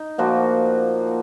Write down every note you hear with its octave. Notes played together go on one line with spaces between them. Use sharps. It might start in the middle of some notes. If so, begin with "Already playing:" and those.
Already playing: D#4
A#2 F3 A#3 F#4